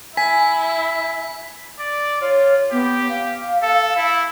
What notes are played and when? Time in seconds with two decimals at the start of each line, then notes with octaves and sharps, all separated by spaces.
0.17 E4 G#5 B6
1.79 D5
2.21 F4 C#5
2.72 B3 G4
3.09 F5
3.62 A4
3.97 E4